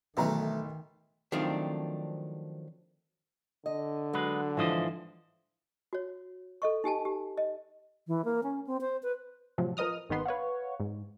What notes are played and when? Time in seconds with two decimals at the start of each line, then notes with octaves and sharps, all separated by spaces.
0.17 B1 D#3 E3 F#3 A3 A#5
1.32 D#3 F3 F#3 A3 C4 D4
3.66 D3 D#5
4.13 F#3 G#3 B4
4.57 G#2 E3 F3 C5 D#5
5.93 F#4 C#5
6.62 A4 D#5 C#6
6.84 D#4 G4 G#5 A5
7.05 G4
7.38 D#5
8.07 E3
8.25 A#3
8.43 C#4
8.67 C4
8.81 C5
9.03 B4
9.58 A2 C3 F3 F#3
9.77 F3 A#4 B4 D#5 D#6 F6
10.09 G#1 G#2 D#3 B3 C6
10.25 B4 C#5 F5 F#5
10.80 G#2